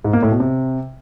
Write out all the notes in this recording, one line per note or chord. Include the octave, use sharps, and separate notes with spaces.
G#2
A#3
A2
B2
C3